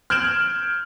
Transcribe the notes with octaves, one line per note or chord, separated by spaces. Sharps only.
F6 G6 G#6 D7 E7 F#7